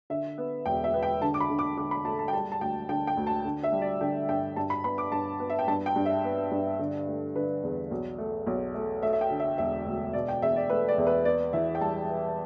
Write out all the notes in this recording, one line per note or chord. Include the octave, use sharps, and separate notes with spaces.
D3 E5
B3
E1 G5
E5
B3
G5
D3 A5
D6
B5
D3
D6
D3 D6
B5
A3 A5
A5
G5
G3 A5
A5
D2 G5
D3 G5
G5
D2
A5
D3
E5
G3
D5
D3 G5
G2 G5
G2 A5
B5
B3 B5
D6
G2 A5
B3
E5
G5
G2 A5
G5
G2
E5
B3
G2
D3
A3
D3 B4
E2
B1
A3
B1
A3
A3 E5
E5
G5
D3
E5
E1 E5
D2
B2 D5
G5
E2 E5
D5
A3 B4
D5
E2
B4
B3 D5
E3 E5
G5
G3 A5
B3